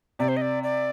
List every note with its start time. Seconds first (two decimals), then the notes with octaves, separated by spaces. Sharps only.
0.19 C3 D5
0.28 C5
0.37 D#5
0.42 D5
0.63 D5